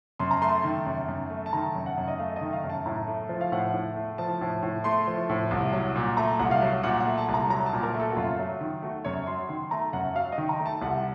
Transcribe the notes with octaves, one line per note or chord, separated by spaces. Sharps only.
F#2 C6
A#5
A3 C6
D#3
F#2
F#2
A3
A5
D#3 A#5
F#2
F#5
F#2
D#5
A3 F5
D#5
D#3
F5
F#2
A5
A2 A#5
A3
F3
F5
A2 F#5
A2
A3
F3 A5
A2
A2
A3 C6
F3
A2
C2
F#3
A#2
A3 A#5
C2 F#5
F5
F#3
A#2 F#5
F#5
A3
A5
C2
A#5
F#3 A#5
A5
A#2
A#4
A3
A4
F#4
F#2 F4
F#3
D#3
A3 F#4
F#2 C#5
F#3 C6
D#3 C6
A3 A#5
F#2 F#5
F#3 F5
D#5
D#3
A#5
A3
A5
C2 F#5